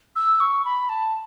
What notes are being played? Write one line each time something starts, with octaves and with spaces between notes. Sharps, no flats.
E6
C#6
B5
A5